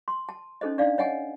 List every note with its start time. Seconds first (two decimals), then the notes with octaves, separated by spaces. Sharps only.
0.08 C6
0.29 A5
0.61 C#4 D#4 A4 C5 D#5
0.78 D4 D#4 D5 F5
0.98 C#5 D#5 F#5 G#5 A5